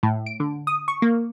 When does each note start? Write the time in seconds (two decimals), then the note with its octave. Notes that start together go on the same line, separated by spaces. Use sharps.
0.03 A2
0.26 D7
0.40 D3
0.67 D#6
0.88 C#6
1.02 A#3